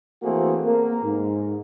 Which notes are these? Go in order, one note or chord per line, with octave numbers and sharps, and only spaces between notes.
E3 A3 A#3 C4 F#4 G#4
A#3
G#2